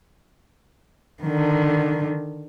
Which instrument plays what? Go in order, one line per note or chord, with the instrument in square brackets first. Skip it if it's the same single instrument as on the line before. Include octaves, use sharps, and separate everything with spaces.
[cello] D3 D#3